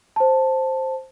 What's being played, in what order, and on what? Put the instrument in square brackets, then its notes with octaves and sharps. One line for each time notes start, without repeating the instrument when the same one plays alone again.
[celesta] C5 A5